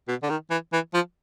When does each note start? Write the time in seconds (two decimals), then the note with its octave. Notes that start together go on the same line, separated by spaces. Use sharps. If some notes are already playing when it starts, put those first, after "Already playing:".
0.08 B2
0.23 D3
0.30 D#3
0.50 E3
0.73 E3
0.94 F3